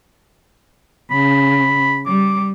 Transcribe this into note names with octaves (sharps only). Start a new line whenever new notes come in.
C#3 B5
G3 D6